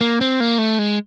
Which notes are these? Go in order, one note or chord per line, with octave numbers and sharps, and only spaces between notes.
A#3
C4
A#3
A3
G#3